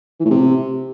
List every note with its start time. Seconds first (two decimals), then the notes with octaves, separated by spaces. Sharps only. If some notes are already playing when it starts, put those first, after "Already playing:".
0.20 E3
0.25 A2
0.30 C3